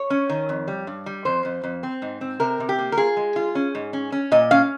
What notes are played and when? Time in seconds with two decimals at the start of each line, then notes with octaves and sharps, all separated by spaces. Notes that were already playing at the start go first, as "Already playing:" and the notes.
Already playing: C#5
0.10 C#4
0.29 D#3
0.49 F2
0.68 G3
0.87 G2
1.06 G3
1.25 F2 C5
1.45 F2
1.64 F2
1.83 C4
2.02 G#2
2.21 C4
2.40 C3 A#4
2.60 C3
2.69 G4
2.78 A#3
2.92 A#4
2.97 F4 G#4
3.17 G#3
3.36 F4
3.55 C#4
3.75 G#2
3.93 C#4
4.12 C#4
4.32 A#2 D#5
4.51 C#4 F5